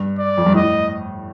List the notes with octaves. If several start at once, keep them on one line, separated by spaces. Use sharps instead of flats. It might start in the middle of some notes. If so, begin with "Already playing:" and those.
Already playing: G2
D5
F2
G2
A2 D#5